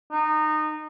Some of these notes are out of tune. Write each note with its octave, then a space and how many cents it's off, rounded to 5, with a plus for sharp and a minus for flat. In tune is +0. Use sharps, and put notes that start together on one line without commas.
D#4 -20